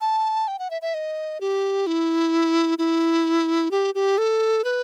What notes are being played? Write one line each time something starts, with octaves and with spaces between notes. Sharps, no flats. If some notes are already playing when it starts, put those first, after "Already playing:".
A5
G5
F#5
E5
E5
D#5
G4
E4
E4
G4
G4
A4
B4